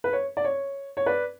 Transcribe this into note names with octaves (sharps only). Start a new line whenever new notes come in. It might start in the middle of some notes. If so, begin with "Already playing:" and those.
B4
C#5
D5
C#5
C#5
B4 D5